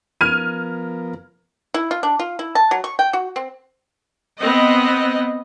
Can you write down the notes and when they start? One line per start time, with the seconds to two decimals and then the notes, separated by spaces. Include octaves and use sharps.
0.21 F3 B3 A#4 F6 G#6 D#7
1.74 E4
1.91 F4
2.03 D4
2.19 F4
2.39 E4
2.55 A5
2.71 F#3
2.84 C#6
2.99 G5
3.13 F#4
3.36 C4
4.41 B3 C4 D#5